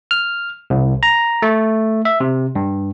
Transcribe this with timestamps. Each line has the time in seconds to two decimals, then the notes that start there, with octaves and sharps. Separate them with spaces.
0.11 F6
0.70 C2
1.03 A#5
1.42 A3
2.05 E5
2.20 C3
2.55 G2